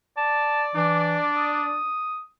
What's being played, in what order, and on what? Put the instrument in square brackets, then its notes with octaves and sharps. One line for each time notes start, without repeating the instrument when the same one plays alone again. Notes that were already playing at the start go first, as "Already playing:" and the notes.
[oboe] D5 [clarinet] A5
[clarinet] E3 [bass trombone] D4
[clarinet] D#6